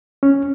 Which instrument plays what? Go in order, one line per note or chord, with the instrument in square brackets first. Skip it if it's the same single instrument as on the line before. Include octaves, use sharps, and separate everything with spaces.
[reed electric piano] C#4